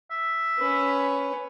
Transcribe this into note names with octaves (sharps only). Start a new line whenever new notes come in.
E5
C#4 B4